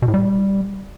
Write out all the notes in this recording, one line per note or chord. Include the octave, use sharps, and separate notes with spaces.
B2
A2
G3